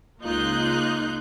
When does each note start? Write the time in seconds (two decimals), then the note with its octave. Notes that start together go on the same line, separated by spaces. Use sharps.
0.22 C#2 A#3 D#4 F4 F#6 G6